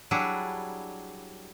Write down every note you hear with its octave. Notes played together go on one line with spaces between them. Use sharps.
F#3 G3 D4 E4 G#4